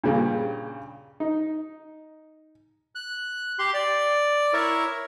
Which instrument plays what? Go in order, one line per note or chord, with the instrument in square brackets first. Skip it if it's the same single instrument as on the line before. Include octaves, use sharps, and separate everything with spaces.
[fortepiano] G2 A#2 C#3
D#4
[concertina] F#6
G4 C6
D5
E4 A#4 C#5 E5